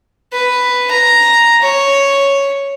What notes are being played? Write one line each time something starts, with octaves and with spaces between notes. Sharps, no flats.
B4
A#5
C#5